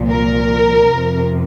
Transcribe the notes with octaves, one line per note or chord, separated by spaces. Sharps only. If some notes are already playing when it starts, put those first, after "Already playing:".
Already playing: C2 A#2 F3
A#4
F2 C3 F3